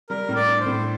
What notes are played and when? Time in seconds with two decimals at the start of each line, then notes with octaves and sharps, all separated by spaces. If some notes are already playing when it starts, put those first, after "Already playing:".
0.10 G3 A#4
0.29 A2
0.35 D5
0.48 D4
0.60 C5
0.66 A2